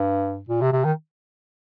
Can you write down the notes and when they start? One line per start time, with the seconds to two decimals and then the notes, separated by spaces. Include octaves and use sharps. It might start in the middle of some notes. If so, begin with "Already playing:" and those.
Already playing: G2
0.49 A#2
0.61 C3
0.73 C3
0.84 D#3